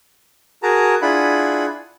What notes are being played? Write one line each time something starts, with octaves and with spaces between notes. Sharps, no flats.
F#4 G#4 A#4 A5 A#5
D4 E4 F4 G#4 F#5 B5